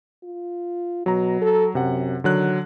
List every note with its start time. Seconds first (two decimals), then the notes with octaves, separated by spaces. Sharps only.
0.23 F4
1.06 B2 F#3 A#5
1.42 A4
1.75 F#2 C3 F#5
2.24 D3 D#3 F#3 F#6